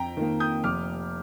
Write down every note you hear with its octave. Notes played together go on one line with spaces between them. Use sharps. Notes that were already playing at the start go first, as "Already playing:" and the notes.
Already playing: F2 G5 A#5
D#3 A#3
D#6 G6
F1 D6 F6